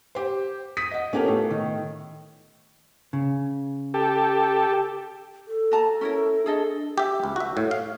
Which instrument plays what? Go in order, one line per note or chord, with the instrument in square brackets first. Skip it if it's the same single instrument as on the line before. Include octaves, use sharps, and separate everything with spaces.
[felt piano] G4 C5
D#6 B6 D#7
D#5 F#5
[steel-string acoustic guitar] B3 F4 A4 [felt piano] C#4 G4 A#4
[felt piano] A2
[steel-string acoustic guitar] D#3
[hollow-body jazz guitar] C#3
[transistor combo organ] G4 A4
[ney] A4
[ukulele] F#4 A5 A#5
C#4 E4 A#4
[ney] D4 [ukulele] G#4 A4 D#5
[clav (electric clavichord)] G4 E5
C#2
F#4 E5
A2
F5